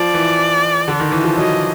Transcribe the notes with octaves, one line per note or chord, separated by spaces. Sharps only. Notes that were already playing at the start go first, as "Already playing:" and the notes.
Already playing: F3 D5
E3
D3
D#3
E3
F3
F#3 D#5